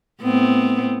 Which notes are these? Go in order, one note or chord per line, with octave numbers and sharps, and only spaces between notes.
A2 B3 C4